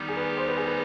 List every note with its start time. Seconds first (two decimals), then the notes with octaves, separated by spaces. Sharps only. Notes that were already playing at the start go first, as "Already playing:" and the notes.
Already playing: D#3 G3 B3 D#4 G4
0.09 G#4
0.17 B4
0.37 C5
0.48 B4
0.58 G#4
0.68 B4